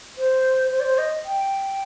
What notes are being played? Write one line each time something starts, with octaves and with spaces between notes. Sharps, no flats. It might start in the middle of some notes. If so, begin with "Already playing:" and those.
C5
C5
D5
C5
D#5
G5